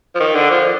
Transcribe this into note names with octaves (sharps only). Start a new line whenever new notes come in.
F3
D#3
D3
F3